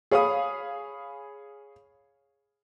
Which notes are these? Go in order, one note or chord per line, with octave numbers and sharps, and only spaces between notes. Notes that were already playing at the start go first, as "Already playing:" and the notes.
G#4 C#5 F5 B5 D#6